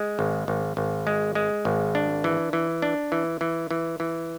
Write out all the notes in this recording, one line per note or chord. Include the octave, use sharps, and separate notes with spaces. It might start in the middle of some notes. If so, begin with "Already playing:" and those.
Already playing: G#3
G#1
G#1
G#1
G#3
G#3
G#1
D4
E3
E3
D4
E3
E3
E3
E3